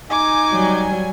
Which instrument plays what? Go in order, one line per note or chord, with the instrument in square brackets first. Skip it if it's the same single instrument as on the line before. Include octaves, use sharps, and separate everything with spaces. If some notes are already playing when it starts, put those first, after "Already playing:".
[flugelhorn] D#4 [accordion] G#5 [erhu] D6
[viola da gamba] F#3 G3